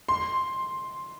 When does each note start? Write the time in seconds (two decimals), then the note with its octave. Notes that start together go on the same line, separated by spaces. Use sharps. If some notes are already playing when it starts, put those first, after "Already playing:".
0.09 C6